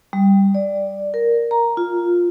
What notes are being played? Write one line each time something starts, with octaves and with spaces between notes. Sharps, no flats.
G3
D5
A#4
A#5
F4